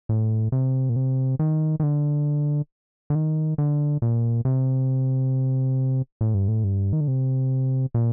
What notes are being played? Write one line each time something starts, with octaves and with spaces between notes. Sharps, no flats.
A2
C3
A#2
C3
D#3
D#3
D3
D3
D#3
D3
A#2
C3
A2
G2
A2
G2
D#3
D3
C3
A#2